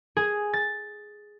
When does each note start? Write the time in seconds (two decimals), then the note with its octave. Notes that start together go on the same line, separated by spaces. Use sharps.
0.17 G#4
0.53 A6